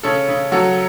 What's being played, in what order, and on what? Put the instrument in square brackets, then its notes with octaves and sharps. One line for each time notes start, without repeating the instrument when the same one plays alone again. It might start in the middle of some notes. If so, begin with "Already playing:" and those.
[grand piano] C#3 A4 C#5
C#3
F#3 F#4 A4